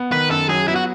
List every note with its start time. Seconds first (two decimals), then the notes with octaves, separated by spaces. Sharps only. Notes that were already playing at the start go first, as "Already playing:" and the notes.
Already playing: B3
0.12 D#3 B4
0.30 F#2 A4
0.49 F#3 G#4
0.68 B3 E4
0.76 F#4